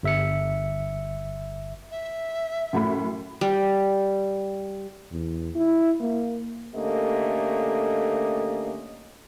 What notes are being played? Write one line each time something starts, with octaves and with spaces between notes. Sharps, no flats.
G1 E5 C#7
E5
F#2 A2 B5
G3
E2
E4
A#3
D3 A3 A#3 C#4 G4 D#5